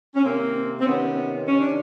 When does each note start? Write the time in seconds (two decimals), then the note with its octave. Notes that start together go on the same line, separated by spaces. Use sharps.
0.15 C#4
0.24 C3 D#3 A#3 C4
0.80 C4
0.85 C3 D#3 B3 C#4
1.47 C3 D#3 C#4
1.60 D4